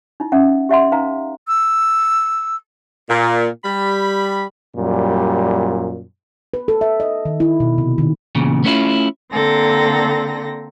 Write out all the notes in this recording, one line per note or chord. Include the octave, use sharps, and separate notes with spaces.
D#4 E4
C#4 E5 F#5
G4 E5 F#5 C6
D#4 B4 F5 A#5
E6
A#2
G3 B5
F#2 A#2 G3
B4
A4
E5
D#5
D#3
E4
B2
C3
D#3
E2 A#2 C#3
A3 B3 C#4 E4 F4
D3 A#3 C4 A4 A#6